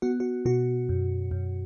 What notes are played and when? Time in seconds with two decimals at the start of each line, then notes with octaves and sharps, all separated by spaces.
0.02 B3 F#4
0.20 F#4
0.45 B2 F#4
0.89 F#2
1.31 F#2